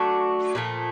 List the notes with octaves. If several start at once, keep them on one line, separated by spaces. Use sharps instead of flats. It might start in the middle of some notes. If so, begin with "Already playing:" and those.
Already playing: F#3 A3 D4 F#4
A#2 F3 A3